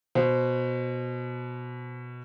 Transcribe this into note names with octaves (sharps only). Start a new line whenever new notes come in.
B2 C5